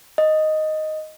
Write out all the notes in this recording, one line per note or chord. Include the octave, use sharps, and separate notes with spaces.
D#5